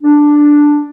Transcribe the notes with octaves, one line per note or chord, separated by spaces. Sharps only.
D4